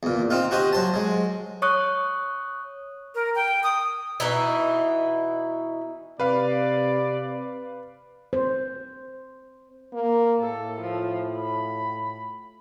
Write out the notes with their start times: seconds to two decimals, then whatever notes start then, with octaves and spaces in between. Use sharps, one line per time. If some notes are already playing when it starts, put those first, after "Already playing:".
0.03 E2 A#2
0.30 C4 D#4 F4
0.51 F#4 G4 C5 D#5
0.73 F#3 C5 A5
0.94 F#3 G#3
1.62 C#5 C#6 D#6 F#6
3.15 A#4
3.35 G5
3.63 D#6
4.20 B2 E3 D#4 E4
6.20 C3 B4 D5 F5
8.33 C5
9.93 A#3
10.40 A2 A4
10.81 F3
11.37 B5